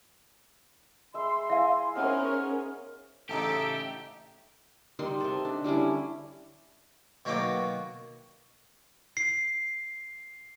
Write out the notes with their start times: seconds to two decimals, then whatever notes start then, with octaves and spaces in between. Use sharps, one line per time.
1.14 G#3 E5 B5 C6
1.50 E4 E5 F5 G#5
1.95 B3 C#4 D#4 G#4 A#4 C5 F6
3.29 A1 C#3 D#4 G4 A4 E5 D7
4.99 D#3 G3 D#4 C6
5.20 C3 A4
5.45 D4
5.64 D3 G3 C#4 E4
7.25 B2 D#3 F#3 A#3 G5 D6
9.17 C7